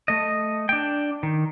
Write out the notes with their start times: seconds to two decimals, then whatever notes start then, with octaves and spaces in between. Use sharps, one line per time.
0.08 A3 D#5
0.69 D4 G5
1.23 D#3